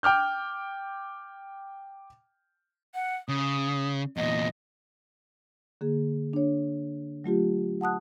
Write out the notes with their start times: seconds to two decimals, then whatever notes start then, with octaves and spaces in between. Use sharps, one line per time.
0.03 G5 D6 F6 G6
2.94 F#5
3.29 C#3 D#6
4.17 E2 A#2 D#5
5.81 D3 A#3 G#4
6.33 D4 C#5
7.24 F#3 A3 F4 G4
7.81 F#5 A5 D#6 F#6